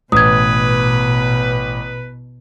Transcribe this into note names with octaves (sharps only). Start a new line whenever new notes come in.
A1 B2 B4 D#6 G#6